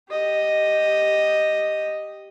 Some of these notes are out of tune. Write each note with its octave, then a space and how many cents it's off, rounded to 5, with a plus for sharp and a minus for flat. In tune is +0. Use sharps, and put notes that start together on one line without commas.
G4 +0 D#5 +0